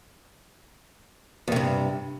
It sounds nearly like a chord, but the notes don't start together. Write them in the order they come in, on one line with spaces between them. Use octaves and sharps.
E2 C3 G2